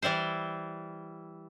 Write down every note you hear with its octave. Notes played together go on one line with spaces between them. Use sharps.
E3 G3 E4 C5